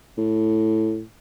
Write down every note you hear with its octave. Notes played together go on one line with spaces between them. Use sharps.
A2